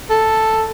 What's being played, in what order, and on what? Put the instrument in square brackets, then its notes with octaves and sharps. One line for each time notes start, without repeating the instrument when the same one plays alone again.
[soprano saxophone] A4